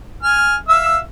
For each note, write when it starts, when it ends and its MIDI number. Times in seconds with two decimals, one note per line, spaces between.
0.23 0.56 80
0.23 0.56 89
0.69 0.98 76
0.69 0.98 77
0.69 0.98 88